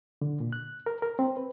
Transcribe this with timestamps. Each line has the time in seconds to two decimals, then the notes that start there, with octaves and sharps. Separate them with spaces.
0.22 D3
0.40 A#2
0.53 F#6
0.86 A#4
1.02 A#4
1.19 C4
1.37 B4